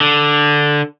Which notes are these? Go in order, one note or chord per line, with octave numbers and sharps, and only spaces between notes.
D3